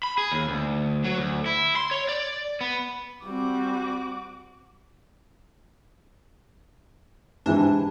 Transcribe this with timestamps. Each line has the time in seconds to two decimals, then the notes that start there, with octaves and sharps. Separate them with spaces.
0.03 B5
0.18 G#4
0.32 D#2
0.48 D2
1.04 F#3
1.18 D2
1.46 E4
1.76 C6
1.91 C#5
2.09 D5
2.61 B3
3.25 G3 C4 F#4 D6
7.46 G#2 C3 E3 D4